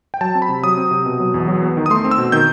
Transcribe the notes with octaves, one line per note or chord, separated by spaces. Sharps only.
G5
F#3 A5
C4
B5
C3
F#3 D#6
C4
C3
B2
F#3
E2
F#3
B3
D#3
D#6
A3 C6
C4
E6
B2
D#3 G6